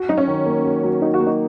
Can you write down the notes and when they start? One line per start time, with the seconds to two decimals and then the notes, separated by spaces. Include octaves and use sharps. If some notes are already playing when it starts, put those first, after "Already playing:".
Already playing: F#4
0.09 F#3 D#4
0.18 C#4
0.27 D#3
0.46 A#3
0.64 F#4
0.83 F#3
1.02 D#3 D#4
1.14 F#4
1.20 A#3
1.27 D#4